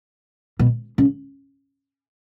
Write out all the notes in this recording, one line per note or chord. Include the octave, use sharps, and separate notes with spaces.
B2
C#3